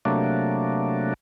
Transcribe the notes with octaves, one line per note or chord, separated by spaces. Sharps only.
C3 F#3 A3 A#3 D4